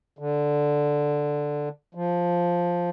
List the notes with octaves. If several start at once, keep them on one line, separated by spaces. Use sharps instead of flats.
D3
F3